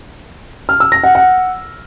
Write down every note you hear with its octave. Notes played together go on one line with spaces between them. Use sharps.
F6
E6
A#6
F#5
F#5